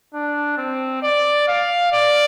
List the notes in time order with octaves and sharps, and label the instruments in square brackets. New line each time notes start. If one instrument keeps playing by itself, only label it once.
[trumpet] D4
C4
D5
F5
D5